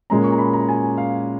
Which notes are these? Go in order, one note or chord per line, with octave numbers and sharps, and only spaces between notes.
A#2 G#3 C#4 A#5
C#6
A#5
B5
A#5
G#5
F5